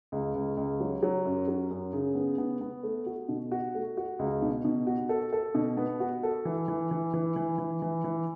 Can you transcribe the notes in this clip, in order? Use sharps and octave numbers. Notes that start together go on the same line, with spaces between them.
C#2
C#2
C#2
F#3
F#3
F#2
F#3
F#2
C#3
B3
B3
B3
A3
F#4
B2
F#4
A3
F#4
C#2
B2
B2
F#4
A4
A4
B2
B3
F#4
A4
E3
E3
E3
E3
E3
E3
E3
E3